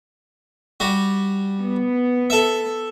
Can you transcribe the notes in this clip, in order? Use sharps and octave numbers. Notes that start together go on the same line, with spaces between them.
G3 F#4
B3
A4 E5